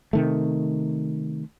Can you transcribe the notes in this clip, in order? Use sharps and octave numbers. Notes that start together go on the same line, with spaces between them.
C3 D#3 A3